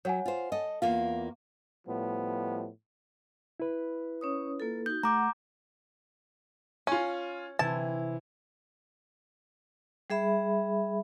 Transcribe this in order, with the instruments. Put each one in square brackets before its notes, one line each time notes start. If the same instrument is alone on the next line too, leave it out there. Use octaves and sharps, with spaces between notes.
[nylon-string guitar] F#3 [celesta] C#5 F#5 G#5
[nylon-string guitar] F4 C5
A4 D#5
[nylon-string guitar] E2 A#3 F4 [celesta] F5
[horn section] A2 F3 G3 B3
[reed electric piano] E4 B4
[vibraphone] C#4 C#5 D#6
A#3 F4 A4
[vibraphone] D#4 F#4 [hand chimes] G6
[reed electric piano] A3 [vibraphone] F#5 [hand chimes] A#5 D6 G6
[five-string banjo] C#4 [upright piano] F4 G#5
[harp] C3 E4 [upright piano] E3 [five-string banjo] A5
[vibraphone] G3 G#4 E5 B5